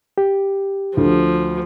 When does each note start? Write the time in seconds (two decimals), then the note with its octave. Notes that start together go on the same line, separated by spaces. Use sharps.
0.18 G4
0.97 D2 F3